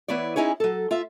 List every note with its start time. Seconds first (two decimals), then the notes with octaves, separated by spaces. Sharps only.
0.08 E3 B3 E4 C#5 D5
0.36 C#4 D#4 E4 G#4 C#5
0.60 F#3 A4
0.91 F4 E5